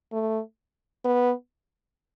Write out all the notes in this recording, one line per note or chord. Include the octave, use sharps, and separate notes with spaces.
A3
B3